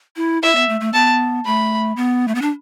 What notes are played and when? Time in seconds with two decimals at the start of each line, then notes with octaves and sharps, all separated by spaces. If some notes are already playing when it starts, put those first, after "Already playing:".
0.16 E4
0.42 E4 E5
0.55 B3
0.69 A3
0.80 A3
0.93 B3 A5
1.46 A3 B5
1.96 B3
2.28 A3
2.35 B3
2.42 D4